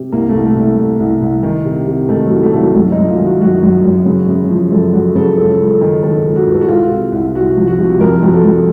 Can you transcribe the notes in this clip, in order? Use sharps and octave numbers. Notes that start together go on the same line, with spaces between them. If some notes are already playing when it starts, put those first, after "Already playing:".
Already playing: C3
C2 A#3
A3
C2
A3
C2
A3
C2
C2
C2
D#3
C3
C3
D#3 A3
F#3
C2
A3
C2 A3
F#3
F#2 A3
F#2 D#4
F4
D#3
F#4
F#2 F#4
F#2
F#2
C#3
C#3
F3
F#2 A4
F#2 F#4
C#3 A4
C#2 A4
C#2
A4
D#3
D#3 A4
C#2
F#4
C#2
A4
F#4
C2 F4
C3
C2
C2 F#4
F3
F#4
C3
F2 A#4
F2 F#4
A4
F2